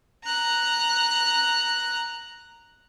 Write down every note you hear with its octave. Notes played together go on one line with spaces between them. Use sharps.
A#5 F#6